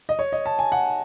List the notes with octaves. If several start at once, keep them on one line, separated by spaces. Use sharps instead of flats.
D#5
C#5
D#5
A5
G#5
F#5